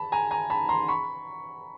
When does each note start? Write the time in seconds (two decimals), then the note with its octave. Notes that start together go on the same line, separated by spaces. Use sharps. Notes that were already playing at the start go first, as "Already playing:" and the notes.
Already playing: A5 B5
0.12 G#5 A#5
0.31 G#5 A#5
0.50 A5 B5
0.69 A#5 C6
0.88 B5 C#6